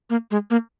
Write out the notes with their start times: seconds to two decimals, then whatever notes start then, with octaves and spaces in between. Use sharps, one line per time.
0.10 A#3
0.31 G#3
0.50 A#3